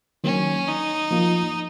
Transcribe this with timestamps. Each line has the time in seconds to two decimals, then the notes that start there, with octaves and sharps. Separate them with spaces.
0.24 D#3 F#3 A#3 C#4
0.68 D#4
1.11 F3 A#3 F4